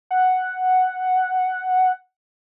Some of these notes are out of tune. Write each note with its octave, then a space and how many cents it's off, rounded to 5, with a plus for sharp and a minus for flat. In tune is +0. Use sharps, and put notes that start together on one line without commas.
F#5 +0